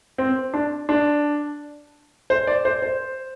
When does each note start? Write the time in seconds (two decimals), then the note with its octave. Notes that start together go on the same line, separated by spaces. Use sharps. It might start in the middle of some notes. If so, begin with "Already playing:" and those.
0.18 C4
0.54 D4
0.89 D4
2.30 C5
2.47 D5
2.65 C5
2.82 C5